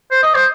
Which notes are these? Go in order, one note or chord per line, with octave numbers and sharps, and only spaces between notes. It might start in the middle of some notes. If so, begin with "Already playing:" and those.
C5
D#5
C5